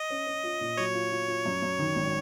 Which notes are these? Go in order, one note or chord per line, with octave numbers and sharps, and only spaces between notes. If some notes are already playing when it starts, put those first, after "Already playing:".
Already playing: D#5
C#4
C#4
F4
A#2
F#3 C#5
F4
F4
F4
F#2
F#2
D#3
G#1